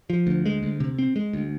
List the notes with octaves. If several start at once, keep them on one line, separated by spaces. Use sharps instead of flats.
F3
D2
G#3
D2
C3
C4
G#3
D2